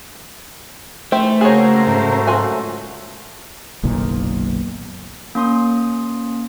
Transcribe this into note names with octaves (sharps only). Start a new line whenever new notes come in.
G#2 D#3 E3 A3 C5 E5 G5
C#3 A#3 C4 F#4 G#4 A#4 C5 C#5
G#2 F#3 A3
F4 F#4 G#5
F#1 B1 A#2 D#3
A#3 C#4 C6 D#6